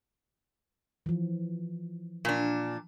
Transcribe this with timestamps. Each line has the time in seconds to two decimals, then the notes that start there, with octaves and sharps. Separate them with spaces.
1.06 E3 F3
2.25 A#2 D4